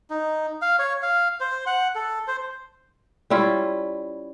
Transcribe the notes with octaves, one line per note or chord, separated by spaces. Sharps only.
D#4
F5
C#5
F5
C5
F#5
A4
C5
G3 C#4 E4 F4